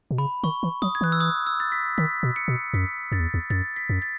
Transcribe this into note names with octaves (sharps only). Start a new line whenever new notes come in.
B2
C#3 B5
D#3 C#6
E3
F#3 D#6
G#6
E3 F#6
E6
D#6
E6
A6
B6
D#3 B6
B2
C#7
B2
F#2 B6
F#2 A6
E2
E2
F#2 A6
B6
F#2
A6